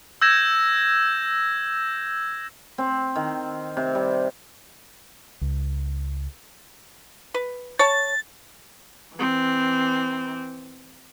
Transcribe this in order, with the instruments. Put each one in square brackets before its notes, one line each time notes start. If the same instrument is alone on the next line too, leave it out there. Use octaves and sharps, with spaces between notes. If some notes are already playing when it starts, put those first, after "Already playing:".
[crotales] E6 G6 G#6 A#6 E7
[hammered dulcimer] C4
D#3
C3
G3
[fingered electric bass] C#2
[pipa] B4
[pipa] C#5 A5 [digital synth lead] A6
[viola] E3 C4